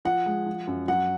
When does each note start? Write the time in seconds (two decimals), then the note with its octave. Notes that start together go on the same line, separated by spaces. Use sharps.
0.05 F3 F#5
0.26 G#3
0.46 F3
0.67 F#2
0.88 F#3 F#5